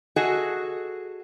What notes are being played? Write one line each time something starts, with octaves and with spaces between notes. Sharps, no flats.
F#4 G#4 A4 D#5